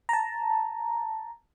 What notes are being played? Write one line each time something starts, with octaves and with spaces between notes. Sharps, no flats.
A5 A#5